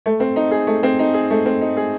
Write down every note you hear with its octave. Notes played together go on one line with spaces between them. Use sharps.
A3
C4
D#4
G#4
A3
C4
D#4
G#4
A3
C4
D#4
G#4